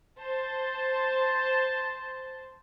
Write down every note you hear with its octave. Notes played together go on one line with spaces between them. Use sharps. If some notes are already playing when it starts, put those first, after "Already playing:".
C5 A5